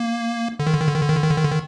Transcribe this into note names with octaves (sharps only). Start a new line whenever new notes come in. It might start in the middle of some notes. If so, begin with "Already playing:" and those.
Already playing: A#3
D3
D#3
D3
D#3
D3
D#3
D3
D#3
D3
D#3
D3
D#3
D3
D#3